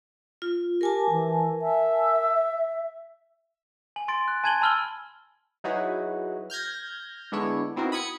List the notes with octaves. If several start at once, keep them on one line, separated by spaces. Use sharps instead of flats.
F4
G4 A#4 G#5 A5
E3
E5
G#5 F#7
C6 A6 D7
F#6
G#5 A5 G#6 D#7 F#7 G7
A5 B5 E6 F6 G#6 G7
F#3 D#4 E4 F#4 G#4 B4
F6 G6 G#6 A#6
D3 G#3 B3 D4 E4 C#5
B3 C4 D#4 E4 F#4 A#4
B5 D#6 G#6 C#7